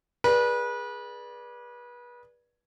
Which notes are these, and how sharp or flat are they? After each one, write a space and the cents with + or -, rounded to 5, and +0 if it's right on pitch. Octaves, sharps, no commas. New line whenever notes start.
G#4 +0 B4 -30 D5 +0